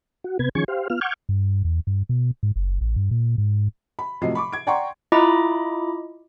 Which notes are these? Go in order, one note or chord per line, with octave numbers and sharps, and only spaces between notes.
F#4
C3 B3 B4 G#6
D#3 F3 C#4 G#4 C#6 G#6
G4 C5 F5
B3 F4 F6
F#5 C#6 D6 F6 G6 G#6
G2
E2
G2
B2
G#2
F#1
A1
G2
A#2
G#2
B5
A2 C3 F3 F#3 D#5 C7
B5 C#6 D6
G#6 D7
D5 F#5 G5 A#5 C6 C#6
E4 F4 D#5 A#5 B5 D6